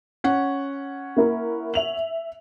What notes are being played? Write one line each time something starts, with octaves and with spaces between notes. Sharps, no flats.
C#4 F#5
A#3 E4 A#4
E5 F7 F#7